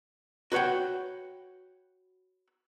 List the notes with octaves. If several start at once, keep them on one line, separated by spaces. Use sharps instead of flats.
F#4 B4 C#5 F#5 G5